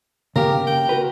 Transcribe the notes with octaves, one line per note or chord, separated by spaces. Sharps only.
C#3 A#3 G4 A#4
G5
F#4 A#4 B4